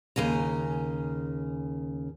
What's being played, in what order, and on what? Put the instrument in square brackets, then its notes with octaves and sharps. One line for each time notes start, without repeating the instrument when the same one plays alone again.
[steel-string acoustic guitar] D#2 C#3 G#5 A#5